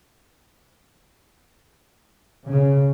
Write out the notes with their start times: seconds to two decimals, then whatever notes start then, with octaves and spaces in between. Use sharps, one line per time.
2.48 C#3